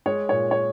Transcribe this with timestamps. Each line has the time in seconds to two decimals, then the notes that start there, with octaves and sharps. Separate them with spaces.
0.06 G#3 C#5
0.29 A#2 C#5
0.51 C#5